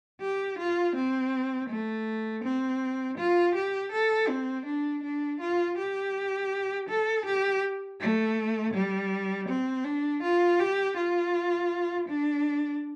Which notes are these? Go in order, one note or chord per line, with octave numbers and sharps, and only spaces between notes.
G4
F4
C4
A3
C4
F4
G4
A4
C4
D4
D4
F4
G4
A4
G4
A3
G3
C4
D4
F4
G4
F4
D4